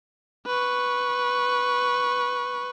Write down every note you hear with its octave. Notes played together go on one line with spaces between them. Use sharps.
B4 C#6